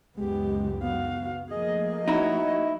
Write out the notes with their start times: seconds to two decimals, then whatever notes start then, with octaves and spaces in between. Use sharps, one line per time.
0.17 C#2 F#2 G#3 B3 G4
0.82 B3 F#4 F5
1.51 F3 A3 A#3 G#4 D#5
2.08 D#4 E4 F#4 C#5